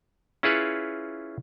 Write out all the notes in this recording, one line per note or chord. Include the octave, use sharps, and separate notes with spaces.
C#4 E4 F4 G#4 B4 C#5